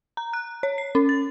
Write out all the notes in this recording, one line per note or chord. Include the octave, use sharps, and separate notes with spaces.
A#5
F#6
C#5
C7
C#4
A6